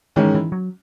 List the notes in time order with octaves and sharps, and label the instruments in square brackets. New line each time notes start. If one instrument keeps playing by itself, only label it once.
[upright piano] G#2 D#3 G#3 C#4 [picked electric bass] E3
[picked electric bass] E3
F#3